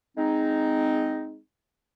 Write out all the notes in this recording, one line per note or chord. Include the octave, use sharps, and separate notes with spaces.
G#3 C4 D#4